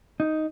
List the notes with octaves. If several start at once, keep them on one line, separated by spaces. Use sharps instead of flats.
D#4